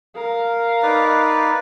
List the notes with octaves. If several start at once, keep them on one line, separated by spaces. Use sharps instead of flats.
A#4 F5
D#4 B4 D5